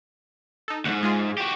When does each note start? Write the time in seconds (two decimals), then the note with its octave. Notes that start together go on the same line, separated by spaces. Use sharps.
0.68 D#4 A4
0.85 D2 G#2 F#5
1.03 G#3 F4 G#4
1.38 F#4 G4